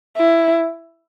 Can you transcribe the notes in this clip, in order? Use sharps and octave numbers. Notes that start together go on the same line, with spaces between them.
E4